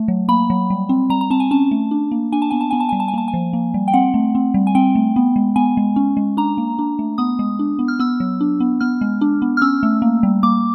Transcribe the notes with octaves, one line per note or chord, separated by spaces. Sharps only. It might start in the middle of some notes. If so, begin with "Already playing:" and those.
Already playing: A3
F#3
A#3 B5
F#3
G3
C4
G3 A#5
A#5
C4 A5
G#5
C#4 A5
A3
D4
A#3
D4 G#5
A5
B3 G#5
A5
B3 G#5
A5
G3 G#5
A5
G#5
A#3 A5
G#5
F3
A#3
G3
G5
C4 F#5
A3
C4
G3
G#5
C4 G5
A3
B3
G#3
B3 G#5
G#3
C#4
G#3
D4 A#5
A#3
D4
A3
B3 D#6
G#3
D4
B3
F6
B3 E6
F#3
D4
B3
B3 F6
G#3
D4
B3
F6
C#4 E6
A3
A#3
G3
A#3 D6